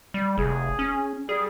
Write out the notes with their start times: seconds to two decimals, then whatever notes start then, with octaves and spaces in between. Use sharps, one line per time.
0.14 G3
0.38 F1 G#4
0.79 C#4
1.29 G3 G#4